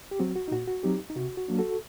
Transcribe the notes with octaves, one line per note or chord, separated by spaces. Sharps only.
G4
F#3 C4 F#4
F#4
D#4
A#2 F#4
F#4
F#3 C4 D#4 G4
D#4
C3 F#4
F#4
F#3 A#3 D4
F#4 A4